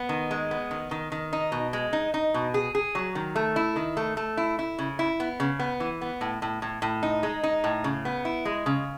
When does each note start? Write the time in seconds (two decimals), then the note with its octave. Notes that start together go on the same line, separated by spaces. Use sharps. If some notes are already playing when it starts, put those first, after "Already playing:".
Already playing: B3
0.09 D#3
0.31 G#3
0.51 B3
0.71 D#3
0.91 D#3
1.12 D#3
1.33 D#4
1.52 B2
1.73 G#3
1.93 D#4
2.14 D#4
2.34 B2
2.54 G#4
2.75 G#4
2.95 F#3
3.15 D#3
3.36 A3
3.56 E4
3.76 D#3
3.97 A3
4.17 A3
4.37 E4
4.59 E4
4.79 C#3
4.99 E4
5.20 B3
5.40 C#3
5.59 B3
5.80 E3
6.01 B3
6.21 A2
6.42 A2
6.62 A2
6.82 A2
7.03 D#4
7.23 G#3
7.43 D#4
7.64 A2
7.84 C#3
8.05 B3
8.25 E4
8.45 G#3
8.66 C#3